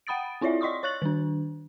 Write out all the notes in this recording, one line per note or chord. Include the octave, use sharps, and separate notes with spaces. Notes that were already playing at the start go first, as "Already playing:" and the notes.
F#5 G5 B5 D#6 A6 D7
C4 E4 F4 C#5 D5 E5
D5 D#5 C6 C#6 D#6
C#5 C#6 F#6 A6 F#7
D#3 D4